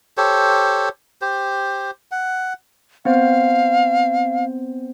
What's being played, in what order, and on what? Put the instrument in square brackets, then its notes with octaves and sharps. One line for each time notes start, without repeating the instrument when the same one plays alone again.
[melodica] G4 A4 C5 C#5
G4 C5
F#5
[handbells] B3 C4 C5 [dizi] F5